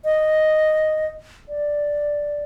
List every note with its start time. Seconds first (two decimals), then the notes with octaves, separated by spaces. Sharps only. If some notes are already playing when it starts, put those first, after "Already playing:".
0.05 D#5
1.49 D5